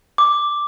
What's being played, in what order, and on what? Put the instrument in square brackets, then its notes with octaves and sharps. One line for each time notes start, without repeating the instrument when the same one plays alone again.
[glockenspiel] D6